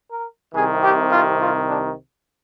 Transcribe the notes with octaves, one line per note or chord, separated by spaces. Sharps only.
A#4
C2 C3 D#3 G#4
G4
F4
F4
D4